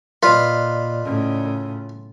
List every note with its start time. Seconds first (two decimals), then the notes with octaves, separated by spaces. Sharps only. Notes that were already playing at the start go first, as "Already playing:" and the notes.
0.23 A#2 F4 A#4 B4 D5 D#5
1.04 A2 C#3